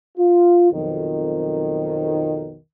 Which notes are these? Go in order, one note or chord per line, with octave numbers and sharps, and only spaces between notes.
F4
B1 F2 D#3